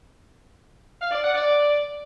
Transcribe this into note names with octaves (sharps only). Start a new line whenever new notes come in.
F5
D5
F#5
D5